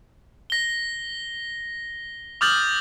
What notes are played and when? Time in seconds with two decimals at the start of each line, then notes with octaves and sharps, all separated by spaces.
0.50 A#6 G7
2.41 D6 D#6 F6 G6 A6 F#7